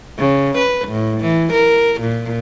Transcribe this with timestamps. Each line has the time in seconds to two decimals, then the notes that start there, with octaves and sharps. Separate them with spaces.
0.19 C#3
0.58 B4
0.88 A2
1.21 E3
1.53 A#4
2.01 A#2